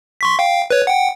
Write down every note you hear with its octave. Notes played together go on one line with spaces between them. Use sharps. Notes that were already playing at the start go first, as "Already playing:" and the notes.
C6 C#6 B6
F5 G5
B4 C#5
F#5 G5